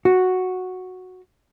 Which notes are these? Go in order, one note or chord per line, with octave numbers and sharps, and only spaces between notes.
F#4